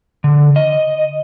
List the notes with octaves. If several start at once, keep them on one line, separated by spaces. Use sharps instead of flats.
D3
D#5